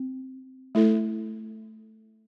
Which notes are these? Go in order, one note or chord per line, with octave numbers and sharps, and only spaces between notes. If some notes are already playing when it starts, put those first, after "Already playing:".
Already playing: C4
A3 E4 A4